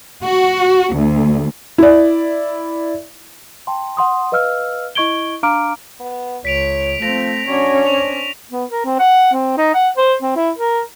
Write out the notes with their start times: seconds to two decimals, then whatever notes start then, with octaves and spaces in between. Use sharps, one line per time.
0.23 F#4
0.94 D2
1.78 E4 D5
3.67 G5 A5 C6
3.97 F#5 C6 D#6
4.32 B4 D#5 F5 E6 F6
4.95 E4 D#5 C#6 G#6 D7 G7
5.43 D4 F5 A#5 D6 F6 D7
6.00 B3
6.45 C#2 C#5 B6 D7 F7
7.02 F3 A3 C4 A#6 F7
7.47 F#3 C#4 D4 C#5
7.87 C4 C#6 F7
8.52 B3
8.70 A#4
8.85 C4
8.99 F#5
9.33 C4
9.58 D#4
9.74 F#5
9.97 C5
10.22 C4
10.36 E4
10.58 A#4